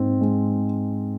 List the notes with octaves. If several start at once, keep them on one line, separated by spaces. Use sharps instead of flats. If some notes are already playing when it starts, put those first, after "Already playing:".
Already playing: G#2 C4
G#3